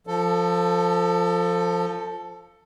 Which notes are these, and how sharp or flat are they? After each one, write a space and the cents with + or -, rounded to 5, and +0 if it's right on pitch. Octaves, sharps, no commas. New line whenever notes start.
F3 +0 A4 +15